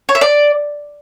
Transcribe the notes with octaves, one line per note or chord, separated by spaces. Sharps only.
C#5
E5
D5